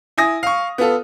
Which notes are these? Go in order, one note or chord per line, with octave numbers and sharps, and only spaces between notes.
E4 G#5 D#6 A#6
F5 C#6
B3 F4 A4